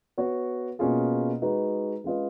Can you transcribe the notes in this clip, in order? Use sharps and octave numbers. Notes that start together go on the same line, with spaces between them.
B3 F#4 C#5
B2 A#3 C#4 F4 G#4
G#3 D#4 F#4 B4
G#3 C#4 F4 B4 D#5